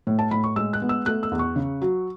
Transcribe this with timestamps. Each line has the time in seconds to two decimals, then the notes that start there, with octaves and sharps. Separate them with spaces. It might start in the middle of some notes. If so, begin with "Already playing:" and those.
0.07 A2
0.19 A5
0.31 A2 B5
0.44 C#6
0.56 G#3 E6
0.73 F#6
0.82 B3
0.89 E6
1.06 A3 F#6
1.23 E6
1.32 E2
1.39 C#6
1.56 C#3
1.82 F#3